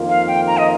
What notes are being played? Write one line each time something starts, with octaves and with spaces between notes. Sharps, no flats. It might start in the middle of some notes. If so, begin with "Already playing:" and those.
Already playing: F2 D#3 A#3 F4
F5
G5
A#5
D#5